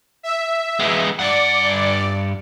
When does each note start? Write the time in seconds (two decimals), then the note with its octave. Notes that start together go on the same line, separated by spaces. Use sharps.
0.23 E5
0.80 G#3 B3
1.19 G2 D5 F#5